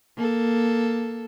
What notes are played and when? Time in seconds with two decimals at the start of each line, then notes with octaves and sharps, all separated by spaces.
0.16 A#3 A4